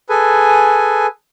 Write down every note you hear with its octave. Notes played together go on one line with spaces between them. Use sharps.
G#4 A4 B4 G#5